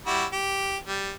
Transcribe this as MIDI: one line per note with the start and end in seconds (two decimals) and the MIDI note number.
0.07 0.25 55
0.07 0.25 64
0.07 0.25 66
0.32 0.77 67
0.88 1.12 55